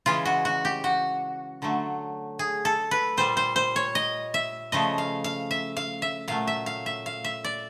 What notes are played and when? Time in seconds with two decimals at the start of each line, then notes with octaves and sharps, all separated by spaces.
0.06 C#3 E3 G#3 F4
0.25 F#4
0.45 F#4
0.65 G4
0.84 F#4
1.62 D3 F#3 A3
2.39 G#4
2.65 A4
2.91 B4
3.17 A#2 G3 C5
3.37 C5
3.56 C5
3.76 C#5
3.95 D#5
4.34 E5
4.72 C#3 F3 A3 D#5
4.98 F5
5.24 F5
5.51 E5
5.77 F5
6.02 E5
6.28 A#2 F#3 A3 F5
6.47 E5
6.66 F5
6.86 E5
7.06 F5
7.24 E5
7.44 D5